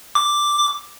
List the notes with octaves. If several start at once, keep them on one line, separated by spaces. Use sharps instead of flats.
D6